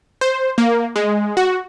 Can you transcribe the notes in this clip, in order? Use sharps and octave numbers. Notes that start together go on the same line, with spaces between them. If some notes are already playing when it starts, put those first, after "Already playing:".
C5
A#3
G#3
F#4